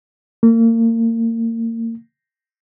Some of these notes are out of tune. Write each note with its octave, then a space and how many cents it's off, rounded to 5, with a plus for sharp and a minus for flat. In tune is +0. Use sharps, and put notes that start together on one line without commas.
A#3 -35